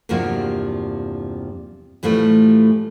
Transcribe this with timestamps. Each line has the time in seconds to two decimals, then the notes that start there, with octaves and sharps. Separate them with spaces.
0.09 E2 G2 C3 F3 A#3 F#4
2.03 A2 E3 F3 G3 A3